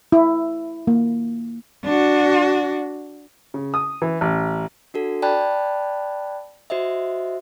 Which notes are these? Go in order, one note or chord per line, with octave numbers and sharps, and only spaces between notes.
E4
A#3
D4 F#4
C#3
D#6
E3
A1
D4 F#4 A4
D5 G5 A5 B5 F#6
F#4 C5 D#5 E5